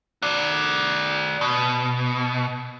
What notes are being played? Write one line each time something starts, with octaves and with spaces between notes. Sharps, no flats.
F#4 D5
B2